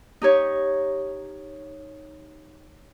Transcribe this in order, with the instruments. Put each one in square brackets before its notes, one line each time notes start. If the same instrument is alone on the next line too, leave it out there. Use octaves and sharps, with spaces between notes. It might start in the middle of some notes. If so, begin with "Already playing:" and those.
[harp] D#4 G4 C#5